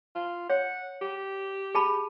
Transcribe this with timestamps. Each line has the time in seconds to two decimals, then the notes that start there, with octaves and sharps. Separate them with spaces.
0.15 F4
0.50 C#5 F#5
1.02 G4
1.75 G#4 A5 B5